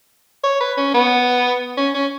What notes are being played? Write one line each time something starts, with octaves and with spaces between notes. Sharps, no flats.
C#5
B4
C#4
B3
C#4
C#4